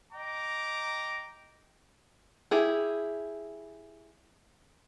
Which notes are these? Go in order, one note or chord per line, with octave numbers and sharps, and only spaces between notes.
D#5 G5 A#5 D6
E4 G4 G#4